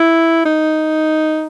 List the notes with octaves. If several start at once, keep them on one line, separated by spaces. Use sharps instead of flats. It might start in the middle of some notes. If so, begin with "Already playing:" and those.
Already playing: E4
D#4